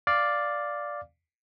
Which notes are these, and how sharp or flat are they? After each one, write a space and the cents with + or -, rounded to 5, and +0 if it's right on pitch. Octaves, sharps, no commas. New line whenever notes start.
D5 +0 F5 +0